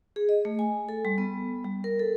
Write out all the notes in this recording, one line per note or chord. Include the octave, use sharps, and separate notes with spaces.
G#4
D#5
A3
G#5
A4
G3
B3
G3
A#4
A4